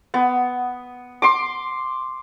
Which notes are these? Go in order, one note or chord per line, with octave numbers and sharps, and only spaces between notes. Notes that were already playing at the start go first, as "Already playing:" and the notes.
B3
C6 D6